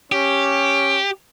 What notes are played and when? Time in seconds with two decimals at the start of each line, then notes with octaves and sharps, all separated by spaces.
0.12 C#4 G4